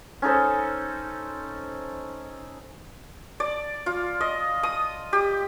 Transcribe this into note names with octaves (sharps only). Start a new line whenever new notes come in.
C#4 D#4 A4 C5
D5
F4
D#5
D#6
G4